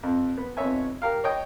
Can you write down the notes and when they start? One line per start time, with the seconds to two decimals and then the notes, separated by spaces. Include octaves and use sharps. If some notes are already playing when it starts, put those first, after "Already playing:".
0.03 F2
0.37 B3
0.57 F2 B3 D#4 C#5 E5 G#5
1.02 G4 A#4 F5
1.24 C#5 D#5 G5